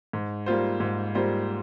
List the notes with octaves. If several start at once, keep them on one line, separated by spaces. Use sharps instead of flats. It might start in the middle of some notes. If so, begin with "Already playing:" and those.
G#2
G3 A#3 F4 C5
G#2
G3 A#3 F4 C5